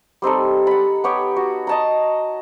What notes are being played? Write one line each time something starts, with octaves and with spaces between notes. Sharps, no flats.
G3 C4 D#4 A4
F#5 B5
B3 G4 C#5
F#4
D#5 A5 A#5